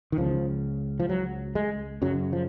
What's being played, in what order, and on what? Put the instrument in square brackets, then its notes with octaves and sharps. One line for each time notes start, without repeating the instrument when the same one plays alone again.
[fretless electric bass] D#3
C#2 C#3 F3
F3
F#3
G#3
F#2 C#3 F#3
F3